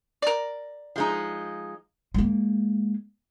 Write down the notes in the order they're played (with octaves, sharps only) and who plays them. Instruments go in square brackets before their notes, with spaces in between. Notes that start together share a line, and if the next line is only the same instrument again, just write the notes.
[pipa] A#4 D5
[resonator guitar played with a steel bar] F3 G#3 D#4
[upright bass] G#3 A#3